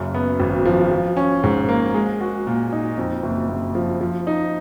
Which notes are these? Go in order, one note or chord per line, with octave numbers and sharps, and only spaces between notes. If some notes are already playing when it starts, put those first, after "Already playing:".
Already playing: F#1 F#2 C#3
B3
G#1
F3
F3
C#4
G#2
A#3
G#3
F#4
A#2
D#4
F2
F#1
F#1
F3
F3
D#4